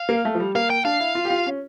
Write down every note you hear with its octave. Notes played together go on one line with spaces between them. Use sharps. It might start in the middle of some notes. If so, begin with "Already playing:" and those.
Already playing: F5
A#3
A3
F3
G3
A#3 F5
G5
D4 F5
E4
F4
G4
F4
C#4